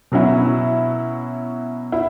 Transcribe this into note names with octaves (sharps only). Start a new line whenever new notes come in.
B2 F#3 C#4 E4
E4